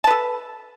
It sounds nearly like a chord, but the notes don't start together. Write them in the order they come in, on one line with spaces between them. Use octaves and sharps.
A5 B4 A4